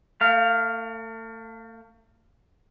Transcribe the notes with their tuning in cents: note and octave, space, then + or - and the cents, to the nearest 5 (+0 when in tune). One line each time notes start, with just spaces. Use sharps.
A3 +35 F5 +0